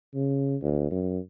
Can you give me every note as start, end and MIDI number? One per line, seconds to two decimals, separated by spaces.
0.14 0.56 49
0.62 0.91 38
0.91 1.18 42